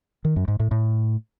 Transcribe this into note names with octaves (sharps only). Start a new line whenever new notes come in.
D#3
F#2
G#2
A2
A2